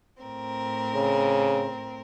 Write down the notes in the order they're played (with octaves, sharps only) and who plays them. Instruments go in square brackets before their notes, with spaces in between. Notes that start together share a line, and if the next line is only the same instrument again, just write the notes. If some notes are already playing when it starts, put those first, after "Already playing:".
[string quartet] A2 C4 A#4
[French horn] C#3